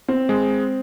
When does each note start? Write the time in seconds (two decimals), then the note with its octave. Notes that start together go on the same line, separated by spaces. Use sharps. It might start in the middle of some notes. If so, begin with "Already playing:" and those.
0.08 C4
0.29 G#3